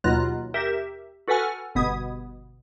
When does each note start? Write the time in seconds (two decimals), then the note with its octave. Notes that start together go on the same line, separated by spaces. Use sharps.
0.04 D#2 B2 F#3 F4 F#6 A#6
0.54 G4 A#4 E5
1.28 F#4 A4 B4 F#5 G#5 F6
1.75 G1 B2 B3 D#6 G#6